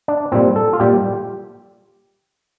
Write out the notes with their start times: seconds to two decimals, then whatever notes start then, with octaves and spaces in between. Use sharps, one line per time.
0.08 D4
0.32 A#2 G3 C4
0.56 A4
0.73 F4
0.80 A#2 G3 G4